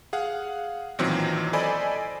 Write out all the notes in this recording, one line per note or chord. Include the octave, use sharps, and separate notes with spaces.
G#4 F5 F#5
A1 A#2 D#3 E3 F#3 C4
A4 C5 D5 D#5 G#5 B5